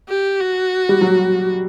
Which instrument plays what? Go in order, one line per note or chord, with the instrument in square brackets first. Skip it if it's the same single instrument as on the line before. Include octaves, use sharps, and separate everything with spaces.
[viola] G4
F#4
[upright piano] G3
F#3